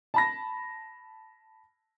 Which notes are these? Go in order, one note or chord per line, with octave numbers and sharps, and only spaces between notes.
A5 B5 A#6